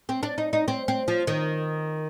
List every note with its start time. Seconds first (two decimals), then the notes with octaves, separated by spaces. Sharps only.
0.09 C4
0.23 D4
0.38 D#4
0.53 D#4
0.68 C4
0.88 C4
1.08 F3
1.27 D#3